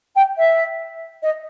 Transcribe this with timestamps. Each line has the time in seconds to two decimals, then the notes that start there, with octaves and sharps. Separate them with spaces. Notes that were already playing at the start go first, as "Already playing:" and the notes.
0.15 G5
0.37 E5
1.22 D#5